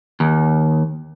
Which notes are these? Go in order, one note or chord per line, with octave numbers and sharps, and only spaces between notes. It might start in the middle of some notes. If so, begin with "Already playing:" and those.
D#2